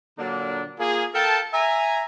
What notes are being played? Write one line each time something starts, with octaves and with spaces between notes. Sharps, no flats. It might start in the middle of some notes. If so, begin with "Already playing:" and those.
A#2 D3 F#3 A#3 D4
A#3 F4 G#4
A4 A#4 F5 G5 A5
E5 G#5 A#5